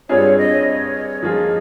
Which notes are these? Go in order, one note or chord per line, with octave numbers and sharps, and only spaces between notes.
G2 G3 C4 F4 G#4 C#5
D#5
C#5
F3 A#3 F4 G#4 D#5